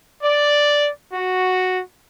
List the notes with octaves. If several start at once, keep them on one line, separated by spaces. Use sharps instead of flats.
D5
F#4